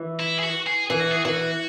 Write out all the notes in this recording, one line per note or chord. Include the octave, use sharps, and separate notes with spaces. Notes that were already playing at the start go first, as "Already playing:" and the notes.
Already playing: E3
E4
G#4
F#4
G#4
E3 G#4
F#4
G#4
E3 F#4